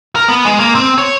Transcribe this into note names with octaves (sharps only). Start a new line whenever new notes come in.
A#4
B3
G#3
A#3
C4
C#5